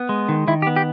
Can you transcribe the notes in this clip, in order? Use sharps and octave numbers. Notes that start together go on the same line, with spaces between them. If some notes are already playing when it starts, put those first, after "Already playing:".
Already playing: B3
G#3
D#3
D#3 E4
G4
B3
G4